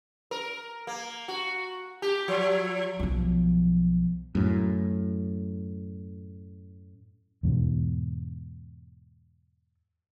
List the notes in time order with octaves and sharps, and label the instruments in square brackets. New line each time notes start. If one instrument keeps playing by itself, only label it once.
[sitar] A#4
A#3
F#4
G4
F3
[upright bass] B1 F3
[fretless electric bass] F#2 A2
[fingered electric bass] E2 G#2 B2